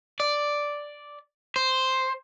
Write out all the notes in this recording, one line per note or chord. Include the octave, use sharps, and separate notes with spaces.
D5
C5